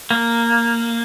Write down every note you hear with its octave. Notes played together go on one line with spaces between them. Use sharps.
A#3